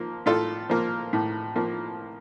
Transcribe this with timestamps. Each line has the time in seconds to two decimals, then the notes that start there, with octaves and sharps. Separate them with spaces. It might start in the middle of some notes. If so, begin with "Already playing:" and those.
Already playing: F3 A#3
0.26 A2 F4 A4
0.70 F3 A#3
1.13 A2
1.56 F3 A#3